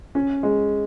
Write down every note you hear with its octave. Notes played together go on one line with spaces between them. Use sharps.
C#4
G#3